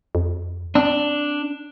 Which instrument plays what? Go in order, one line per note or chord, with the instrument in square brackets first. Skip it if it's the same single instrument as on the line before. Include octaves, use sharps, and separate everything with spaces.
[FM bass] F2
[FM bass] C4 [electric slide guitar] D4